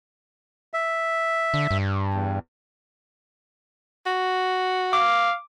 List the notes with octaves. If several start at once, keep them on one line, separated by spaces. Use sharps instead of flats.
E5
D3
G2
E2
F#4
F5 D6